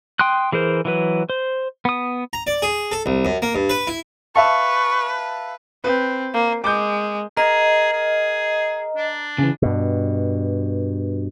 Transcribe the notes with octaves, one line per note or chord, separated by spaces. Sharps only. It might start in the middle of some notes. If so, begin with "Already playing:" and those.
G5 C6 D#6 F#6
E3 G#4 A#4 C5
E3 F#3 B4
C5
B3 D#6
A#5
D5
G#4
A4
C2
F#2
A#3
G2
B4
E4
B4 E5 F5 A5 C#6
C4 B4
A#3
G#3 D6 G6
G#4 A#4 D#5
G#4
D4
C#3 E3
G2 B2